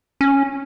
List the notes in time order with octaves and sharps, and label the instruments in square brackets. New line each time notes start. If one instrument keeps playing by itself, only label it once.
[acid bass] C#4